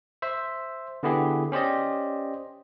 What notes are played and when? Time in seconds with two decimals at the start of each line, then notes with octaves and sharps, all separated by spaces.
0.22 C5 E5
1.03 D3 B3 E4 G4 G#4
1.52 C#4 G4 C5 D5 D#5